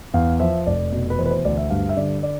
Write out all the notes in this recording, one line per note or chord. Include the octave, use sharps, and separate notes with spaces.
E2 F5
F3 E5
F1 D5
B2
B4
E3 C5
B4
C5
D2 D5
E5
G2 F5
E5
D3 D5
D5